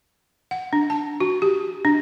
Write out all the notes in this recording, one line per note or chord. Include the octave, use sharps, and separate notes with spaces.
F#5
D4
A5
F#4
G4
D4